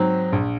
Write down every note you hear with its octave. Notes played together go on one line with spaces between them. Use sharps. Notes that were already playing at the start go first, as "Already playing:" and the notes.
Already playing: G#2 F#3 C4
A#1